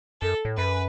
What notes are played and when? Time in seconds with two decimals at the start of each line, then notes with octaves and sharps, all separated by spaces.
0.21 F#2 A4
0.45 A2
0.57 F#2 B4